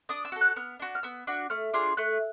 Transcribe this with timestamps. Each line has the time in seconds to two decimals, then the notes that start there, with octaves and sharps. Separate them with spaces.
0.09 D4 D#6
0.25 E6
0.32 F#4 A4
0.41 F#6
0.56 B3 F6
0.80 D4 F#4
0.95 F6
1.03 B3 E6
1.27 D4 F#4
1.50 A3 F6
1.73 D4 F4 G#4
1.97 A3 F#6